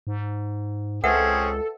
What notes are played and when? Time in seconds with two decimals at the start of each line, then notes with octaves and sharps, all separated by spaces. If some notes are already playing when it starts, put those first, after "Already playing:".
0.07 G#2
1.04 C#2 C4 C#4 G#4 A4 B4 E5 F#5